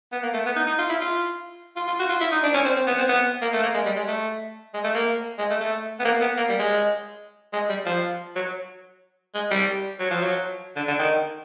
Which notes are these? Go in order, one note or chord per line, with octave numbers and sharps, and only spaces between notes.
B3
A#3
A3
B3
D#4
D#4
F4
E4
F4
F4
F4
F#4
F4
E4
D#4
D4
C#4
C4
C4
B3
C4
B3
A#3
A3
A#3
G#3
G3
G#3
A3
G#3
A3
A#3
G#3
A3
A3
B3
A#3
B3
A#3
G3
G#3
G#3
G3
F3
F#3
G#3
G3
F#3
F3
F#3
D3
D3
D#3